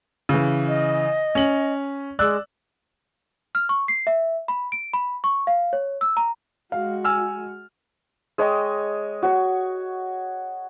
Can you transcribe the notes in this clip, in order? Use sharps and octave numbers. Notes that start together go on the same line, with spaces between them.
C#3 E3
D#5
C#4 F#7
G#3 D5 E6 F#6
F6
C#6
C7
E5
B5
D7
B5
C#6
F5
C#5
E6
A#5
G#3 F#4 F5
G#5 E6 F6
G#3 C#5 D#5 G5
F#4 C#5